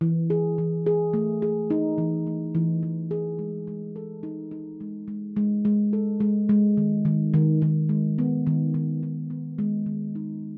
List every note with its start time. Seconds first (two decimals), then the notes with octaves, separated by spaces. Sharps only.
0.01 E3
0.30 G#4
0.58 E3
0.86 G#4
1.14 A3
1.42 G#4
1.70 D#4
1.98 E3
2.27 A3
2.55 E3
2.83 E3
3.11 G#4
3.39 G#3
3.67 G#3
3.96 A4
4.23 D#4
4.51 D#4
4.81 G#3
5.08 G#3
5.36 G#3
5.65 G#3
5.93 A4
6.20 G#3
6.49 G#3
6.77 D#3
7.05 D#3
7.34 D#3
7.62 D#3
7.89 G#3
8.18 B3
8.47 D#3
8.74 D#3
9.03 D#3
9.30 B3
9.58 G#3
9.86 D#3
10.15 D#4